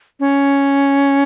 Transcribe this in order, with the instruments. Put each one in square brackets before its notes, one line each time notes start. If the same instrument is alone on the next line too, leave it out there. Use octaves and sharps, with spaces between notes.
[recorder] C#4